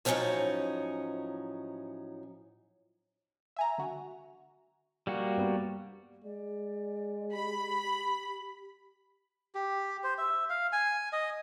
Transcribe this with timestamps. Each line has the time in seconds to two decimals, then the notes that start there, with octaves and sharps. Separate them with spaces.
0.05 A2 F3 F#3 C4 C#4 D#4
3.56 E5 G#5 A#5
3.78 D3 F#4
5.07 G3 A#3 F#4
5.37 G2 C3 B3
6.24 G#3 D5
7.32 G4 B5
9.55 G4
10.03 C5
10.18 E5
10.50 F5
10.72 G#5
11.13 D#5